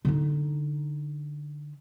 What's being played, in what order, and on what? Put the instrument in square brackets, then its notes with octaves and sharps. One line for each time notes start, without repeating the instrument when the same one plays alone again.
[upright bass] D3 D#4